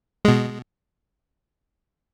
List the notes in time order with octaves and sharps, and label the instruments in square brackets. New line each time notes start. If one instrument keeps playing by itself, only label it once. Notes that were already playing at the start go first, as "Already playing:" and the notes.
[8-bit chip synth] B2 G#3